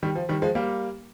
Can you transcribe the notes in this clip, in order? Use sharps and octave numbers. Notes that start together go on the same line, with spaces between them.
D#3 G3
F3
D#3 G3
F3 G#3
G3 A#3